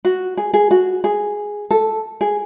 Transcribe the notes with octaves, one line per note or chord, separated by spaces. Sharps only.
F#4
G#4
G#4
F#4
G#4
A4
G#4